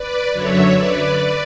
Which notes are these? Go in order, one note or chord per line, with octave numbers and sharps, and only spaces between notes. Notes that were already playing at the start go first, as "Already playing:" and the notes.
Already playing: B4 D5
F#2 D3 F#3 C#5 E5
B4 D5